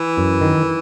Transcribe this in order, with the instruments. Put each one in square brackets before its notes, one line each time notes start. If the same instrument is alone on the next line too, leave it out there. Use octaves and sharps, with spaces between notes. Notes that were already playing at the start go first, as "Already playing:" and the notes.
Already playing: [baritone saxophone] E3
[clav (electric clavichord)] F#2
D#3